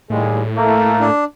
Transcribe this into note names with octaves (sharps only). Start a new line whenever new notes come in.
D#2 A2 G3 G#3
A3 A#3
D4